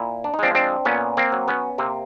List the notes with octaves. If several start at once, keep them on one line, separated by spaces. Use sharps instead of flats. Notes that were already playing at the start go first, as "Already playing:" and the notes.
Already playing: A#2 E4
D4
D#4
F3 G#3 C4 D4
C4 D4
A#2 B3 C#4
A#3 C4
F#3
B3 C#4
C3 A#3 C4